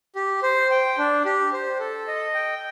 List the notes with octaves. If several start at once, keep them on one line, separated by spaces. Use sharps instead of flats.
G4
C5
G5
D4
G4
C5
A4
D#5
G5